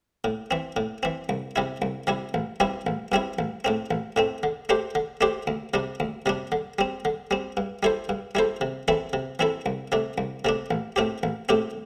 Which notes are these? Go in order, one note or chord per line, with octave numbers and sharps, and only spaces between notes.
A2
E3 C4
A2
E3 C4
C2
C3 G3 E4
C2
C3 G3 E4
A1
G2 G3 C4 E4
A1
G2 G3 C4 E4
A1
A2 A3 C4
A1
A2 A3 C4
D3
A3 D4 G4 C5
D3
A3 D4 G4 C5
D2
C3 G3 D4
D2
C3 G3 D4
D3
G3 C4
D3
G3 C4
G2
G3 E4 A4 C5
G2
G3 E4 A4 C5
C3
E3 C4 E4 A4
C3
E3 C4 E4 A4
C2
C3 A3 D4
C2
C3 A3 D4
A1
A2 A3 C4 G4
A1
A2 A3 C4 G4